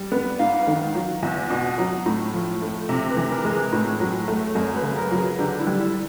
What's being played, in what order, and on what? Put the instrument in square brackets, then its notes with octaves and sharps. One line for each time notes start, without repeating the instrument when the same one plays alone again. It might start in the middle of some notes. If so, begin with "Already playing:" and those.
Already playing: [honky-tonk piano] G3
B3
[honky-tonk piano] G#2 [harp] F5
[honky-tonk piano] D#3
[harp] F5
[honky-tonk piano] F#3
[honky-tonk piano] E2 [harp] E5
[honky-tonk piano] B2
F#3
A2
F3
A3
[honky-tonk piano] C3 [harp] E5
[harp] B4
[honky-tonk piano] E3
[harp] A#4
[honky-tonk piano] G#3
[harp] G#4
[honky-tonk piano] A2
F#3
A3
[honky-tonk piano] F#2 [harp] A#4
[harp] B4
[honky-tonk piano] C#3
[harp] A#4
[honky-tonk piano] F#3
[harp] G#4
[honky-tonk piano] D3 [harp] G4
[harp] E4
[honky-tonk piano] G3
[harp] E4